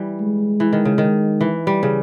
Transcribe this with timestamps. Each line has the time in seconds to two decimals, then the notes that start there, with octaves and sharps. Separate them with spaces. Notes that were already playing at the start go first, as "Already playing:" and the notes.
Already playing: E3 G3
0.21 G#3
0.60 E3
0.73 D#3
0.85 C#3
0.98 D#3
1.41 E3
1.67 G3
1.83 C#3